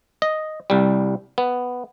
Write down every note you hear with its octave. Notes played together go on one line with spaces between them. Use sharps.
D#5
C2 G3
B3